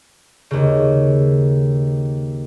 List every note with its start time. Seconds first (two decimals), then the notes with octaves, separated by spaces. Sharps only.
0.51 D#2 C#3